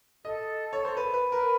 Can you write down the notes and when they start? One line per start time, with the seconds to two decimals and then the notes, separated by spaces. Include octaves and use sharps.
0.25 A4 D#5
0.73 C#5
0.85 C5
0.97 B4
1.13 B4
1.32 A#4 B4